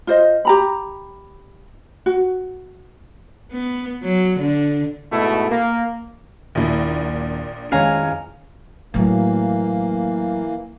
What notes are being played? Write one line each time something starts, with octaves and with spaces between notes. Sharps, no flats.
F4 C5 D#5
G4 A#5 B5
F#4
B3
F#3
D3
G#2 B2 A3 E4
A#3
D#1 A#1 A#2 E4
F2 D#3 G#3 C#4 C#5 F5 G#5 A#5
A2 E3 F#3 A#3